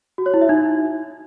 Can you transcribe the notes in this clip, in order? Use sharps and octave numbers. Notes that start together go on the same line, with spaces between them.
F#4
C#5
E4
E5
D#4